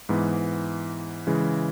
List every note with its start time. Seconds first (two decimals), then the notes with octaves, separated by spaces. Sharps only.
0.09 G#2 E3 B3
1.27 C#3 E3 G#3